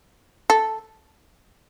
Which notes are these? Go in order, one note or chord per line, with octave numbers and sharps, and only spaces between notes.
A4